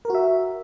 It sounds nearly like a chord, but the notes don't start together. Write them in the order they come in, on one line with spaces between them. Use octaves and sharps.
A#4 F#4 E5